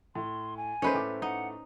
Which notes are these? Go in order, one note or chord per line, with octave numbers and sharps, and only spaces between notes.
A2 C6
G#5
A3 A#3 C#4 D#4 B4 C5
A2 A3 D6
D#4 F#5